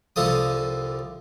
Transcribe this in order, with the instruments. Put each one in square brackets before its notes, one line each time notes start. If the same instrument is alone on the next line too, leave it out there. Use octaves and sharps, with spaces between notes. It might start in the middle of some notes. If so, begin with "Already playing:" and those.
[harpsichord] C2 D3 F3 A4 D#6